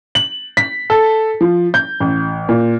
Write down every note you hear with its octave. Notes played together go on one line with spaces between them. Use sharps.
F#7
B6
A4
F3
G6
A1
A#2